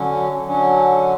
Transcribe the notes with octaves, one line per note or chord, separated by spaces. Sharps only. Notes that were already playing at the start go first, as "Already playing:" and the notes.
Already playing: D3 F#3 C#4
D3 F#3 C#4